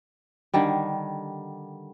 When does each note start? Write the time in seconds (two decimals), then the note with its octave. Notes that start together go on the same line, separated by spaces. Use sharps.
0.54 D3 D#3 G3